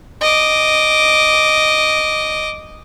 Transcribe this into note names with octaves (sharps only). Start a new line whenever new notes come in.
D#5 D6